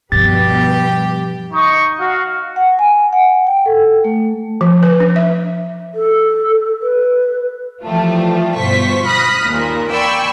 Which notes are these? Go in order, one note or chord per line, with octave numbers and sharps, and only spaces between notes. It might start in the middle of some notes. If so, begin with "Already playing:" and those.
G2 B2 F3 G3 G4 B4 A6
D#4 D#5 C#6
F#4 F5
F#5
G#5
F#5
G5
A4
A3
F3
B4
D4
E5
A4
B4
E3 F3 G3 A3 F4
G1 B2 F4 C5 C#6 B6
B5 D#6 F6 F#6 A#6 B6
D#2 A#2
D5 G5 G#5 B5 C#6 E6